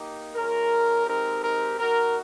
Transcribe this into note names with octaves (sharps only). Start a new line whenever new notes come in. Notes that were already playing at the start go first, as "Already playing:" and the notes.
Already playing: A#3 D#4 G4
G#3 C#4 F4 A#4
G#3 C4 D#4 G4 A#4
A#4
A#3 D#4 F#4 A#4